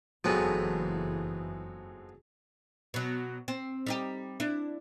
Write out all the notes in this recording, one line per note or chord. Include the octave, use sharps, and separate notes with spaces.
F#1 F2 G#2 E3 F#3 B3 G#4 A4
B2 F#3
C4
G3 D#4 G4
D4 E4